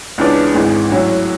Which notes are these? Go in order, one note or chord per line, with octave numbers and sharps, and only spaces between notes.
C#2 C#3 E3 B3 D4
G#1 G#2 E3 G#3
A2 F#3 C#4 E4